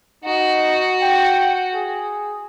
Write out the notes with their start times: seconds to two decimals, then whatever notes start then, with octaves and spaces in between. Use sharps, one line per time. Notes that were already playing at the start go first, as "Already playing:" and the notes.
0.25 D#4 F#4
1.02 G5
1.75 G#4